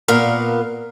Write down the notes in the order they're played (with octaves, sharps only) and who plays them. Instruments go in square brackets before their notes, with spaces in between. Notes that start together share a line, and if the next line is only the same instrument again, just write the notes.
[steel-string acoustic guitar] A#2 B3 A#4 F5